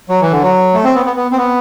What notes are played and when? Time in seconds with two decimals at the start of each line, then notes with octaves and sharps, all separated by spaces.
0.09 F#3
0.21 E3
0.31 D3
0.42 F#3
0.74 A3
0.84 C4
0.95 B3
1.06 B3
1.16 B3
1.32 C4
1.37 B3